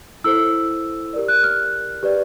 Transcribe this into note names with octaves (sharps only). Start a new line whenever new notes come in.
E4 A4 C5 E6
G4 A#4 D5
F#6
F6
G4 B4 D5